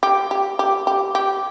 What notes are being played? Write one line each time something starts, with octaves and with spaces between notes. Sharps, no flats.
G4
G4
G4
G4
G4